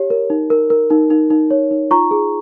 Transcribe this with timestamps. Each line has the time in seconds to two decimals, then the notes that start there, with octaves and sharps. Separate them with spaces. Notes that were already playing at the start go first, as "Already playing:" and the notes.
Already playing: G4 C#5
0.10 A#4
0.30 D#4
0.50 A#4
0.70 A#4
0.90 D#4
1.10 D#4
1.30 D#4
1.51 C#5
1.71 D#4
1.91 F4 A#5 C#6
2.11 G#4